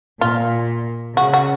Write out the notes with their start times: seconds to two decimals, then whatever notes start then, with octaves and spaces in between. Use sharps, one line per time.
0.21 A#2 F4
1.17 C#3 F#4
1.34 F#4